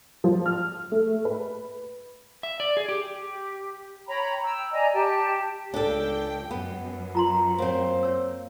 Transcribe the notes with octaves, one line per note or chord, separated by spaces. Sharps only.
F3
F6
A3
B4
E5
D5
G#4
G4
G4
C#5 G5 A#5 B5
G5 E6
D5 D#5 G#5 A#5
G4 G5 A5
C#2 D4 A4 G5
F#2 B3
F4 A#5 C6
A#3 C4 C5 C#5 F5
C#5 E6